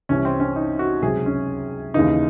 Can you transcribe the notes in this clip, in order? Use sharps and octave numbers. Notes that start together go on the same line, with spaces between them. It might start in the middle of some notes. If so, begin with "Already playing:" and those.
C2 C3 E3 C#4
C4
C#4
D#4
F#4
C#2 C3 F#3 G#4
C#4
D#2 C#3 E3 D#4